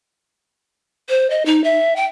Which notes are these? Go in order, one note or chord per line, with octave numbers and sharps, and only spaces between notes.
C5
D#5
D#4
E5
G5